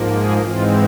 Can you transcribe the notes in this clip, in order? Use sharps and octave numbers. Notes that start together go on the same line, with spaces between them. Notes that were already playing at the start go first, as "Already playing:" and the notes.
Already playing: G#2 F3 A#3
G#4
G#2 E3 G#3 C4 F4